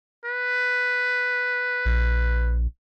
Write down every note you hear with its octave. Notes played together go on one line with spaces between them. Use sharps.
B4
A#1